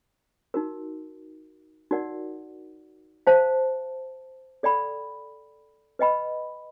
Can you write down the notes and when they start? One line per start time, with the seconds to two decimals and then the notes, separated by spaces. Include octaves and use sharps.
0.54 D#4 F#4 A#4
1.91 D#4 F#4 A#4 D5 F#5
3.27 C5 F5 A5
4.63 A4 D5 G5 B5
5.99 B4 D#5 G5 B5